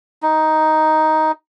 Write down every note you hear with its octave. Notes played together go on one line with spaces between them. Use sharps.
D#4